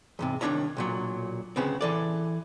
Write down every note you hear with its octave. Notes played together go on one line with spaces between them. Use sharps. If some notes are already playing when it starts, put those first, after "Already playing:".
E2 G#2 C3
C2 D#3 D4 E4 C#5 A#5
B1 A#2 F#3
D2 C#3 B3 C4
E3 A4 D5